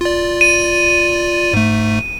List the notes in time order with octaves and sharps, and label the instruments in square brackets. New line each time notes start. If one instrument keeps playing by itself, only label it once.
[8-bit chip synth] F4 D5
[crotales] D#7
[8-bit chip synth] G#2 A3